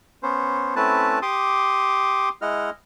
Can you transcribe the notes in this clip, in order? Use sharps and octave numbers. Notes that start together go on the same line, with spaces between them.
B3 C#4 C5
A3 C4 C#4 E4 B4 A5
G4 C6 D6 D#6
G#3 E4 D#5 F#5 F6